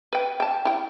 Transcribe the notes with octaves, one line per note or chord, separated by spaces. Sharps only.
B4 G5
G5 A5
E4 G5